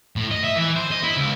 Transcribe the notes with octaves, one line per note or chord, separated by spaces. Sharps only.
A2
D#5
E5
E3
C5
D#5
E4
C#2